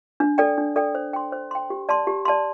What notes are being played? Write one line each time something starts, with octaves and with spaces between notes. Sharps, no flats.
D4
A4 D5 G5
D4
A4 D5 G5
C5
G5 C6
C5
G5 C6
G4
D5 A5 C6
G4
D5 A5 C6